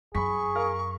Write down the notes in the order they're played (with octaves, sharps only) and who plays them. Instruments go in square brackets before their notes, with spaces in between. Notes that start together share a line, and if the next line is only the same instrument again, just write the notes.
[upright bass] F#2 [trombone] G#4 [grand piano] B5 B6 [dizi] C#6
[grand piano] A#4 F5